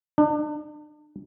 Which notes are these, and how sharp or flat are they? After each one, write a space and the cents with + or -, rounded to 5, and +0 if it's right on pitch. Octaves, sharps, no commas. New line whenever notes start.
D4 +40